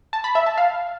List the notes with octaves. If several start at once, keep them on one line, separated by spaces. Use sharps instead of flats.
A5
B5
E5
A5
F5